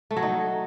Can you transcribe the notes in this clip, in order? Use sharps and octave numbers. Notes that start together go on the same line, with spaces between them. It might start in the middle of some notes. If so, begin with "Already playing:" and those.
A3
F#3
D#4